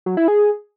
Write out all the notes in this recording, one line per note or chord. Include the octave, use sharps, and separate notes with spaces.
F#3
E4
G#4